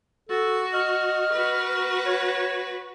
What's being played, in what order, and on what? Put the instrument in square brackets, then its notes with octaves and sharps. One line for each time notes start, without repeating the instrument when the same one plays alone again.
[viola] F#4 [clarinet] A4
[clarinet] D#5 [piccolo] F6
[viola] F#4 B4
[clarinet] C#5